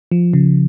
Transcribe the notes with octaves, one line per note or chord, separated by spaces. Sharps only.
F3
C#3